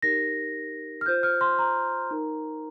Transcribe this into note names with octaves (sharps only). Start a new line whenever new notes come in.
D#4 G4 A#4 A#6
F6
F4 C5 G6
F6
C6
A#5
D#4 A#4